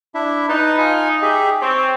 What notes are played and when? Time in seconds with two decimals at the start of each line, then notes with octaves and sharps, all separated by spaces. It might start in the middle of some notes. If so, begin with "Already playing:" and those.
0.14 D4 E4 E5
0.49 D#4 B4 A5
0.78 F4 D#5 G#5
1.22 G4 G#4 E5
1.61 C4 C#5